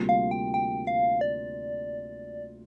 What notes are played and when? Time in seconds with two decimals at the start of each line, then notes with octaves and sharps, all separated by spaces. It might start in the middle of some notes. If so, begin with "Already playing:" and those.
Already playing: D2 C3 G3 A#3 F4
0.09 F5
0.31 G5
0.54 G5
0.87 F5
1.21 D5